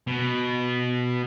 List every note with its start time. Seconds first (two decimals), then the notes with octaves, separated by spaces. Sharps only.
0.07 B2